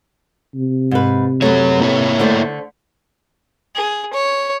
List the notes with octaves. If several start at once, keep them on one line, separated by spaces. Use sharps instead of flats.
C3
G#2 B4
F#2 F#3 A3 B3 C#5
A#3 E4 C#5
D3 A3 C5
G#4
C#5